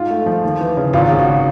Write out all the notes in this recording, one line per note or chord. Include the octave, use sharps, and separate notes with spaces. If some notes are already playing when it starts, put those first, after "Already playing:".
Already playing: G#2 F4
A3
F3
D#2
E3
C#3
G#1 F4
C#3
F#4